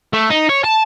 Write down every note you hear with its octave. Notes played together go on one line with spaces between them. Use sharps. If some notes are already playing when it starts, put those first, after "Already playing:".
A3
D#4
C#5
A5